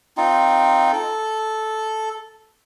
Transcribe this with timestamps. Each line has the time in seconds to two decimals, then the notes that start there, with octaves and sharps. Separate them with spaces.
0.17 C4 D#4 F4
0.92 A4